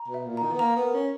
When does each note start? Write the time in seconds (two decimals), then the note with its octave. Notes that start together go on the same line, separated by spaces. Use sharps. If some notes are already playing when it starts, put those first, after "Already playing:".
Already playing: A#5
0.08 B2
0.14 E5
0.26 A#2
0.37 A#5
0.42 D#3
0.53 B3
0.59 A#3 A#5
0.77 B3
0.82 A#4
0.94 C#4